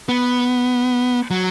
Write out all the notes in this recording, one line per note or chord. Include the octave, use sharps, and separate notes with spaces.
B3
F#3